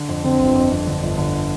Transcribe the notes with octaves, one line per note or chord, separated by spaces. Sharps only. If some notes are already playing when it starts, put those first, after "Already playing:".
Already playing: D3
F2
D3 C4
G1
F2
F2
D3
G1
D3